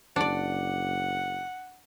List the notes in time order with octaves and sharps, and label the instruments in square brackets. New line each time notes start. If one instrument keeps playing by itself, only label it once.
[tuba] F#1 [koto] D4 D5 [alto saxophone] F#5